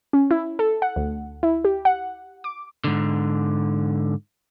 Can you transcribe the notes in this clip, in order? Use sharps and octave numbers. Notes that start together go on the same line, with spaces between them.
C#4
E4
A4
F#5
D2
E4
G4
F#5
D6
G#2 D3